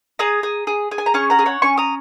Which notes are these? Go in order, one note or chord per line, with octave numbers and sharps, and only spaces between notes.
G#4 A#5 D#6
G#4
G#4
G#4
G#5
A#5
C#4 G#5 C#6
F#5 A#5
G#4
C#5 F#5
C#4 G#5 C#6
A#5 D#6